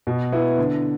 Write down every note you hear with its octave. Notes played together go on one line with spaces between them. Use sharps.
B2
B3 E4
D3